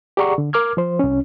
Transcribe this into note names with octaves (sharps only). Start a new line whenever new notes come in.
G4 G#4 D5 F#5 A#5 C#6
D3
A#4 D6 F6 G#6
F3 C5
C2 C#4